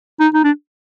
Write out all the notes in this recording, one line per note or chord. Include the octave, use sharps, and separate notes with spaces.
D#4
D#4
D4